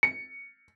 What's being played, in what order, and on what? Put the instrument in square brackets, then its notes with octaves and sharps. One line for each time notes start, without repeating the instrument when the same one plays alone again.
[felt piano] C#7